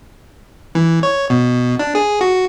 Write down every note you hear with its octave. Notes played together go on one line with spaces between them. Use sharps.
E3
C#5
B2
D4
G#4
F#4